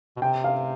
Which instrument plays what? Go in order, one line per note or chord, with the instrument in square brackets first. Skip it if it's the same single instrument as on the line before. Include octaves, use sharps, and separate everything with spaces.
[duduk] B2
[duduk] C3 [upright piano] G5
[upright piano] F5